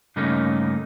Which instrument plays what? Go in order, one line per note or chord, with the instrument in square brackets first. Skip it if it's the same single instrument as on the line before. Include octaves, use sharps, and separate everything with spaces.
[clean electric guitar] G2 C#3 A3 A#3 C#4 D#4